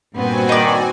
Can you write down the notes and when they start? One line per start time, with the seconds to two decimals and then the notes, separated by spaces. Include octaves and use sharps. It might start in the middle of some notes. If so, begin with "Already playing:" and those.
0.14 G2 A#2 B3 C4 F#4 G#5
0.49 D#3 D#4 D5